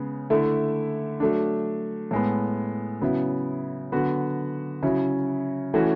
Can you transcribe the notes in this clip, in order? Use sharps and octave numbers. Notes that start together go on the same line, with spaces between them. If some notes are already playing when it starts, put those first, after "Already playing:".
Already playing: C#3 G#3 B3
D3 A3 E4
F#3 A3 D4
A2 G#3 B3
C#3 F#3 B3 E4
D3 F#3 B3 F#4
C#3 F#3 C#4 E4
E3 A3 C#4 F#4